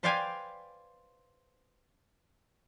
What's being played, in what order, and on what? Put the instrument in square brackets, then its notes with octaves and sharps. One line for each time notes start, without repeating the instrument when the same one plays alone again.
[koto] B4 C5 D5 F5 G5 G#5